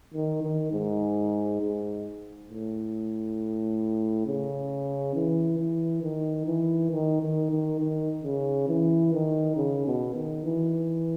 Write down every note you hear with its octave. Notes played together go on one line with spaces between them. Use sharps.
D#3
D#3
G#2
G#2
A2
C#3
E3
E3
D#3
E3
D#3
D#3
D#3
D#3
C#3
E3
D#3
C#3
B2
D#3
E3